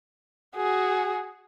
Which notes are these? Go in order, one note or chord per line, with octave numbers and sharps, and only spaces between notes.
F#4 G#4